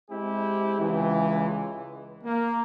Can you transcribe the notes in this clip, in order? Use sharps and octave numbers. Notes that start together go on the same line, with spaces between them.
G#3 C4 E4 G4
C#2 E3
A#3